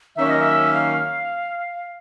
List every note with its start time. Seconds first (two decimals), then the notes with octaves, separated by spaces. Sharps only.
0.16 D#3 F#3 A#3 C#4 E5
0.30 D#5
0.41 E5
0.74 F5